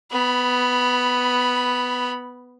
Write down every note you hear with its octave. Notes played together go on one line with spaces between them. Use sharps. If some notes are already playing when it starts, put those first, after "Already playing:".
B3 B5